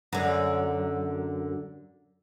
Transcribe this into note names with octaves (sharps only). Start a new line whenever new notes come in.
F#2 D3